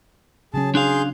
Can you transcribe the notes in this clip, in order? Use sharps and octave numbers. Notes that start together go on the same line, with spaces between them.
C#3 F#3 C#4 G#4 A5
D4 G#4 F5 C6 G6